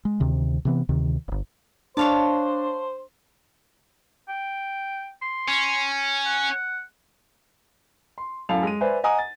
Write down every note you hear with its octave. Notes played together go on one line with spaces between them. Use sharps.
G#3
D2 C3 D#3
C3 E3 B3
D2 C3 D#3
D1 G1
D4 C5 C#5 F5 A5
G5
C6
C#4
F#5
C6
F#2 A2 A4 F5 F7
G#3 D#7
B4 C5 D5 E5 G#5
D#5 F#5 G#5 A#5 D#6
A6